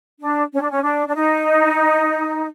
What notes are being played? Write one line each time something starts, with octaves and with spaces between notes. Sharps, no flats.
D4
C#4
D4
C#4
D4
D4
D#4